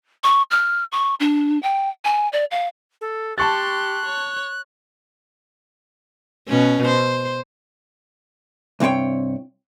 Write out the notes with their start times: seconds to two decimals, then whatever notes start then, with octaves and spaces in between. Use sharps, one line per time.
0.24 C#6
0.51 F6
0.92 C#6
1.20 D4
1.63 G5
2.05 G#5
2.33 D5
2.51 F5
3.01 A4
3.38 G4 A5 C6 C#6 F#6 A6
4.05 C#5
6.49 B2 C#4
6.87 C5
8.80 C2 G2 C4 C#5 G5